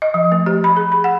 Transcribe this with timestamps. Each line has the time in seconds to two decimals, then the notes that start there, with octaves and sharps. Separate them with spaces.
0.02 D#5
0.14 F3
0.32 A3
0.46 G4
0.64 B5
0.77 G#4
0.92 B5
1.04 F#5